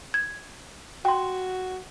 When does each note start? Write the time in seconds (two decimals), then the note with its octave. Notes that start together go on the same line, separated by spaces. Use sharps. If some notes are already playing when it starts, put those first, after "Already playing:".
0.14 G#6
1.05 F#4 G5 C6